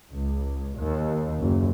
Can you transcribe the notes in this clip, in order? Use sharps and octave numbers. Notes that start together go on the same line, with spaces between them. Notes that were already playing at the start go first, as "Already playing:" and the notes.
C#2
D#2
F#1